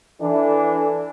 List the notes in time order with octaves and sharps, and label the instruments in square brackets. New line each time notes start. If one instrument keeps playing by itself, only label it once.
[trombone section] E3 D4 [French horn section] A4